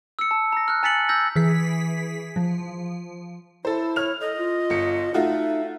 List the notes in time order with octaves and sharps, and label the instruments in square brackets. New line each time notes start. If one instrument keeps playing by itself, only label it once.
[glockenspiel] E6 C#7
A5
A#5 A#6
F6 F#6
G#5 A#5 A6 B6 C#7 F#7
E6 G6 A#6
[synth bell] E3 G#4 B6
F3
[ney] E4 [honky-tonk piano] A4 C5
[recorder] C#5 [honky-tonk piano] F6 F7
[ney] A4 [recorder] D#5
[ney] F4
[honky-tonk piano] G1 C#7
[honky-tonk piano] A3 F4 F#4 [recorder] D#4 [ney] E5